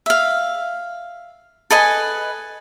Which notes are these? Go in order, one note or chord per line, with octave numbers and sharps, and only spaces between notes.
E5 F5
A4 B4 D#5 G#5